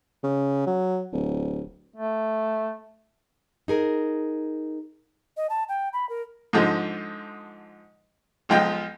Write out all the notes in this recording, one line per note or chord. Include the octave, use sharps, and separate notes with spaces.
C#3
F#3
D1
A3
D#4 G#4 A#4
D#5
A5
G5
B5
A#4
G#2 D3 F3 G#3
B1 F3 G#3 F4 G5